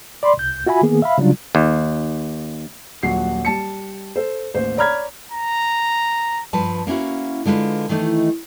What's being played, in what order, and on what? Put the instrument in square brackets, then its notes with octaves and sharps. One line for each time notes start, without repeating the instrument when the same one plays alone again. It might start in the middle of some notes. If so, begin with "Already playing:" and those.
[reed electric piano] D5 B5 C6
C2 G6
F4 F#4 E5 G#5 B5
D#3 A#3 B3 G#4
E5 F5 B5
C#3 F#3 G3 D4 F4
[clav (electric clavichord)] D#2
[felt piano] D#1 A#1 F#3 F#4 F#5 C7
G3 A5 C#7
A4 C5
A1 D#2 C5
C#5 D5 A#5 B5 F6 G#6
[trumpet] A#5
[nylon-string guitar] G2 F3 B4 A5
A#3 C#4 E4 F#4
D3 G#3 F4 B4
D#3 E3 A3 D#4